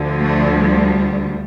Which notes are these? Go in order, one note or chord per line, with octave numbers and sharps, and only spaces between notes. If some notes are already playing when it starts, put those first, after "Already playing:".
Already playing: D2 D3 F3
A3
G3